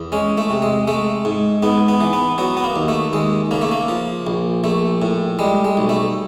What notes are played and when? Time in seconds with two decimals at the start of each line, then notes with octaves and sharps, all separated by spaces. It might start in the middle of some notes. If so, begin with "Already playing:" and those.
Already playing: E2
0.12 G#3 C#4
0.38 A3
0.50 C3
0.62 G#3
0.87 G#3 A3
1.25 G#2
1.63 G#2 B3
1.88 B3
2.01 E3
2.13 B3
2.38 F#3 B3
2.57 B3
2.64 A#3
2.76 D#2
2.88 A3
3.13 D#2 G#3
3.51 C#3 A#3
3.61 A3
3.71 A#3
3.88 F3
4.27 A#1
4.64 A#1 A3
5.02 A2
5.39 G3 G#3
5.64 G#3
5.77 B1
5.89 A3